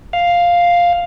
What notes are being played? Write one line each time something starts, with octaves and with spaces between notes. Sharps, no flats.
F5